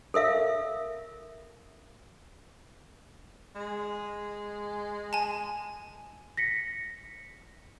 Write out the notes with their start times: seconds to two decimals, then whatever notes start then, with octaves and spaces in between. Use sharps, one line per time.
0.14 A4 A#4 E5 F5
3.55 G#3
5.13 G#5 A5
6.37 A#6 B6 C#7